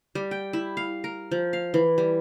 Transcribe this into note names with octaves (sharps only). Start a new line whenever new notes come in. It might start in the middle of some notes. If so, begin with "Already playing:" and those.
G3
G5
E4
F5
A#4
F3
F5
E3
G3